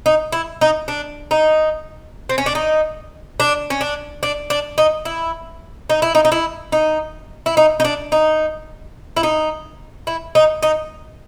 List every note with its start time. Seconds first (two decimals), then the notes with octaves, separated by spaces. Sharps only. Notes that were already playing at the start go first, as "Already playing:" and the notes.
0.06 D#4
0.32 E4
0.61 D#4
0.88 D4
1.31 D#4
2.29 C4
2.38 C#4
2.46 D4
2.55 D#4
3.40 D4
3.70 C#4
3.81 D4
4.23 D4
4.50 D4
4.78 D#4
5.05 E4
5.90 D#4
6.02 E4
6.15 D#4
6.25 D#4
6.32 E4
6.72 D#4
7.46 E4
7.57 D#4
7.80 D#4
7.84 D4
8.12 D#4
9.16 E4
9.23 D#4
10.07 E4
10.35 D#4
10.62 D#4